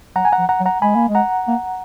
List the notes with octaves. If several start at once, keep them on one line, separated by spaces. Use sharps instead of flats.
F#3 F#5 A#5
G#5
F#5 A#5
F3
F#5 A#5
F#3
F#5 A#5
G#3 G#5 B5
A#3
G#3
F#5 A#5
A#3